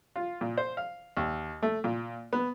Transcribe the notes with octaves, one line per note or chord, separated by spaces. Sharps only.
F4
A#2
C5
F5
D#2
A3
A#2
B3